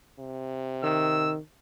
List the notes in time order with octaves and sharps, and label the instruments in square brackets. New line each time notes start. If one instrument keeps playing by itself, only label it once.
[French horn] C3
[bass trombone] D#3 [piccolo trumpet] E6